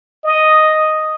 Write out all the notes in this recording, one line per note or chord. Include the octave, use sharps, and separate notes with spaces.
D#5